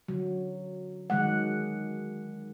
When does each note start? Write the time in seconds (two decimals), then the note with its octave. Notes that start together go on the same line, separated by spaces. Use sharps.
0.08 D3 F#3
1.10 D#3 F#3 G#3 F#5